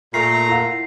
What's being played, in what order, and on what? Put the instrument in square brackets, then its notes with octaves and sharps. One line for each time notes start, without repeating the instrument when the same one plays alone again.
[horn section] A#2 A3 [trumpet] A#5 [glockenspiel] C7
[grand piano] E4 F5 F#5